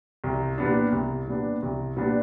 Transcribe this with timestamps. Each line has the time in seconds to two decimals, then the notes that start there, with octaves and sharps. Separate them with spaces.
0.24 C2
0.58 A#2 G3 B3 D4
0.92 C2
1.27 A#2 G3 B3 D4
1.62 C2
1.97 A#2 G3 B3 D4